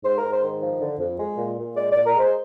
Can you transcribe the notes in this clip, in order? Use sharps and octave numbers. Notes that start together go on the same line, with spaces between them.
G#2 C5
G#2 A#4
C5
D#3
F3
D3
F2
G#3
A#2
A#2
G#3 D5
A#2 D5
A#4
G#3 C5